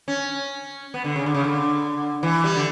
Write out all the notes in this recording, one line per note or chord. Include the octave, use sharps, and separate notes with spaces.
C#4
B3
D3
C#3
D3
C#3
D3
E3
G3
D3